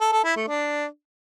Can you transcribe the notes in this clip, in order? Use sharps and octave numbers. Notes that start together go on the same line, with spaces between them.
A4
A4
E4
A3
D4